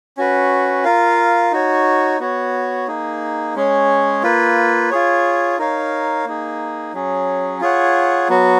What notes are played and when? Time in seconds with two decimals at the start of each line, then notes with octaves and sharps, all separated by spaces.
0.17 C#4 F#4 B4
0.85 F4 A#4 F5
1.52 D#4 F#4 C#5
2.20 B3 F#4 C#5
2.88 A#3 D#4 G#4
3.55 G#3 C#4 G#4 C#5
4.23 A#3 F4 B4
4.90 F4 G#4 C#5
5.58 D#4 A#4 C#5 F5
6.25 A#3 D#4 G#4
6.93 F#3 C#4 G#4
7.61 F4 G#4 C#5 F#5
8.29 F#3 B3 F#4